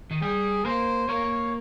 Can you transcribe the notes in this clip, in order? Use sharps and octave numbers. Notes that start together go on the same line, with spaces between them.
D#3 D#4
G3 G4 G#4
A#3 A#4 C5
A#3 A#4 C#5